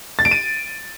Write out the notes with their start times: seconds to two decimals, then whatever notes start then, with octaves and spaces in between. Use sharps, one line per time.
0.19 A6
0.25 D7
0.31 D#7